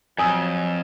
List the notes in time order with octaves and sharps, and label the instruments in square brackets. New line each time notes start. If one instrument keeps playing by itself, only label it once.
[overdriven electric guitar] F2 [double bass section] F#3 [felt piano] G#5 D#6 E6